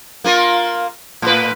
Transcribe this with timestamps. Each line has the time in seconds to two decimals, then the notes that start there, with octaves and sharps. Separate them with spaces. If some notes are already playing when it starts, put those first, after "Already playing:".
0.24 A#3 F4 A#4
1.22 A2 B4